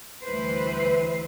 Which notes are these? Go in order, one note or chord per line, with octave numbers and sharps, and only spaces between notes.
D2 E3 G3 B4 C5